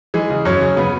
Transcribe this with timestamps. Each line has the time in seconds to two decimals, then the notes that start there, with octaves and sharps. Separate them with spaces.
0.14 E3 G#3 G#4
0.30 C#3
0.45 F#2 C#4 C#5
0.61 C#3
0.77 C#3 B3 B4